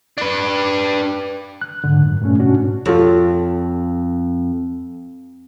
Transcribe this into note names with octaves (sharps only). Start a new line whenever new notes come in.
D4 B4
F#6
G#2 D3
F#2
G2 A#2 A3 C#4
G#2 B2 C#4 D4 F#4
F2 F4 A4 C#5